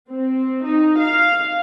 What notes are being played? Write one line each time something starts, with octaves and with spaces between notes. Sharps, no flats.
C4
D#4
F5